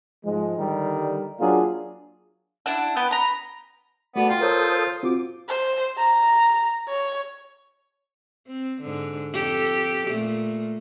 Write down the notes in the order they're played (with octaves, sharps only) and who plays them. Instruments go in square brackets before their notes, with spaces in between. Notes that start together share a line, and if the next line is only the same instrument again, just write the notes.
[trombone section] G#2 F3 G#3
D3 D#3 G3
F#3 A#3 D4 F4 G#4
[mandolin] D4 E4 F#5 E6
B3 B4 G5
A#5 B5
[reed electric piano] A3 F#4 A4 [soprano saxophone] B3 [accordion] D5
[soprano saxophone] F4 [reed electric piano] G5 C6
[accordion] A4 C5 D#6 [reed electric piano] A#4 C#5
[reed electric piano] C4 F4 F#4 [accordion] D6
[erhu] C5
A#5
C#5
[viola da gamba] C4
G#2 D3
F2 G4 A4
A#2 A3